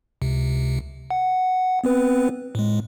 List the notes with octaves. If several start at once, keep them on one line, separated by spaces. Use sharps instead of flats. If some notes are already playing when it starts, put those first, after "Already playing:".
C#2 C3
F#5
B3 C4 B4
A2 G#3